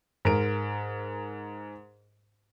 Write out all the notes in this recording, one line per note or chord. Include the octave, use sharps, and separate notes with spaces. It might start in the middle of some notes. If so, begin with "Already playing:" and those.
G#2 A#4 D7